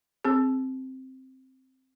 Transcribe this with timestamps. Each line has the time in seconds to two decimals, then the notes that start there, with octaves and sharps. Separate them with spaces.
0.24 C4 G#4